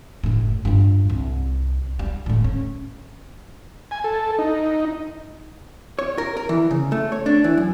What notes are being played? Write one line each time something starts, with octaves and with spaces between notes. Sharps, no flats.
F#1 A2
G2 F4
C2
G3
A2 A3
C#4
G#5
A4
D#4
C#5
A#4
A#4
E3
C#3
A3
C#5
D4
E3
F#2